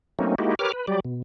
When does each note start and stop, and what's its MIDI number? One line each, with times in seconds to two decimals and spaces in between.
0.19 0.35 54
0.19 0.35 57
0.19 0.35 58
0.19 0.35 60
0.19 0.35 61
0.19 0.35 63
0.38 0.55 56
0.38 0.55 58
0.38 0.55 63
0.38 0.55 64
0.38 0.55 66
0.38 0.55 67
0.59 0.72 67
0.59 0.72 70
0.59 0.72 71
0.59 0.72 73
0.59 0.72 86
0.59 0.72 89
0.73 0.86 71
0.87 1.00 54
0.87 1.00 55
0.87 1.00 67
0.87 1.00 74
1.05 1.22 47